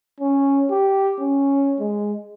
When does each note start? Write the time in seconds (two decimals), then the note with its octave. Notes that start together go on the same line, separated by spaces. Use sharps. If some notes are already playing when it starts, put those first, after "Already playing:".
0.20 C#4
0.71 G4
1.20 C#4
1.79 G#3